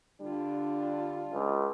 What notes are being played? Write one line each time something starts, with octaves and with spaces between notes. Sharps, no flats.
D3 G3 D4 F4
C#2